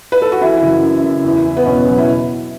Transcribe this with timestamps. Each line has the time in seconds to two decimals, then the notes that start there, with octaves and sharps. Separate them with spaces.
0.12 B4
0.22 A4
0.32 F#4
0.41 E3 E4
0.62 F#1
0.83 F#2
1.03 C#3
1.25 E2
1.45 E2
1.57 B3
1.65 B2 C#4
1.87 F#3
1.98 E4